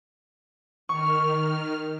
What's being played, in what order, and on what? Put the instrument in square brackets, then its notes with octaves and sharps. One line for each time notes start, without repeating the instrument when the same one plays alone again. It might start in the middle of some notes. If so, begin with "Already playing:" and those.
[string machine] D#3 F6 [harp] C#6